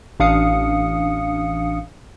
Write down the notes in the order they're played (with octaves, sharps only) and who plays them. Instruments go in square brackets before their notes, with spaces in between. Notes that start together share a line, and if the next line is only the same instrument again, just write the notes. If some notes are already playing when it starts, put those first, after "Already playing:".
[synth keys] A1 D4 F5 D#6 C#7